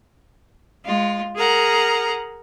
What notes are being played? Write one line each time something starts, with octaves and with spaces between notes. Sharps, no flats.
G#3 F4
G#4 A#4 F#5 A#5